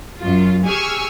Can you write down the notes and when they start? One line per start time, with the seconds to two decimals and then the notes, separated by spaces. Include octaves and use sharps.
0.19 F#2 F4
0.65 G4 G#4 G#5 C#6 E6 F6